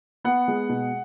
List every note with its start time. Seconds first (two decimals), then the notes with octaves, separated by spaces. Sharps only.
0.24 B3 F#5
0.48 G#3
0.69 B2